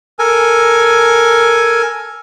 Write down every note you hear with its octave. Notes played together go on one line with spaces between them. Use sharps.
A4 A#4 G#5